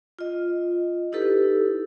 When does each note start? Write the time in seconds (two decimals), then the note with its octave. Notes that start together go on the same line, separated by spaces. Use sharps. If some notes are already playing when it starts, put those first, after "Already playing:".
0.19 F4 D#5
1.12 D#4 E4 G4 A4 B4